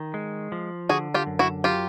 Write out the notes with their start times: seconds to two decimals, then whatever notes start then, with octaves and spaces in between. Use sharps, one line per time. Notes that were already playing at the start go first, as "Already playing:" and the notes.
Already playing: D#3
0.14 G#3
0.52 F3
0.89 D3 F#4 G#4
1.14 F4 G4
1.26 F#2
1.39 E4 F#4
1.64 F#3 F4 G4